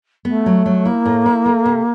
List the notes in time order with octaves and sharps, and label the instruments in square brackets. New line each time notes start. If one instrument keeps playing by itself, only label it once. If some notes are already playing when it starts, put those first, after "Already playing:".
[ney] A3 [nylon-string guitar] B3
[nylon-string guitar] F#3
F#3
[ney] A#3 [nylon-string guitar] E4
[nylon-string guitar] A2
E4
A3
C3